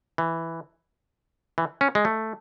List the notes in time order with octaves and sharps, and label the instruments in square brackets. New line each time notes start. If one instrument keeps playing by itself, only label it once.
[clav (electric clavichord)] E3
E3
C#4
G#3
A3